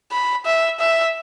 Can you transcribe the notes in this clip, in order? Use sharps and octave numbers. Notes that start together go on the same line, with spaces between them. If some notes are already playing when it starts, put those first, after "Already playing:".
B5
E5
E5